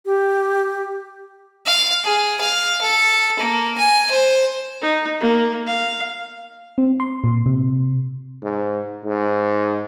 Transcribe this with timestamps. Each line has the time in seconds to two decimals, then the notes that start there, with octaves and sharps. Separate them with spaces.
0.06 G4
1.66 F5
2.04 G#4
2.41 F5
2.82 A4
3.39 A#3
3.78 G#5
4.11 C5
4.81 D#4
5.20 A#3
5.66 F5
6.78 C4
7.00 C6
7.24 A#2
7.46 C3
8.43 G#2
9.05 G#2